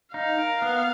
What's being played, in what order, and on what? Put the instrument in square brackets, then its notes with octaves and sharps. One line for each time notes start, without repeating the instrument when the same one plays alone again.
[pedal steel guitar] D#4 [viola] F5
[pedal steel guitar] A#4
B3